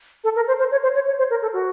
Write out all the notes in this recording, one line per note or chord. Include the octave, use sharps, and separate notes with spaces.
A4
A#4
C5
C5
C#5
C5
C#5
C#5
C5
A#4
A4
F#4